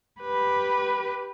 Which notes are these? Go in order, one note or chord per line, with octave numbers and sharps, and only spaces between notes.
G4 B4